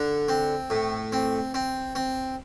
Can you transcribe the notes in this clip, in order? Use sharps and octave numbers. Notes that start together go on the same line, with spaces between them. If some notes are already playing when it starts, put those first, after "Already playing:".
Already playing: D3
C4
A2
C4
C4
C4